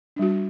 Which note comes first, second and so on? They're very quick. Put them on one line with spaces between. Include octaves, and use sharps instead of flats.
D4 G3 F#4